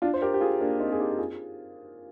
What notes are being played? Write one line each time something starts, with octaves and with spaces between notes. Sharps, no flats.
D4 F4
C5
G4 A#4
G4
F4 G#4
A#3 D4
C4 D#4
G#4
D#4 G4
F4 G#4